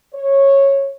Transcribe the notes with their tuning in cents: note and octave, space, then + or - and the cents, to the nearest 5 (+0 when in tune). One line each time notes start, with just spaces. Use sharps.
C#5 -10